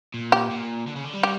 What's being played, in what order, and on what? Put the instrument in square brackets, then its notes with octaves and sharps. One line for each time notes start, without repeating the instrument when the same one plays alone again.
[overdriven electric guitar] A#2
[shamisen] G4
[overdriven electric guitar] A#2
D3
C#3
D3
G3
[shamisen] G4